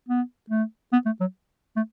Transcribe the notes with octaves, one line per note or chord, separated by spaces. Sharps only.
B3
A3
B3
A3
F#3
A3